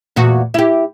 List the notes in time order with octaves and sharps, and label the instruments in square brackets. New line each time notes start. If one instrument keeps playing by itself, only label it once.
[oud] E2 A#2 F#4
E4 G4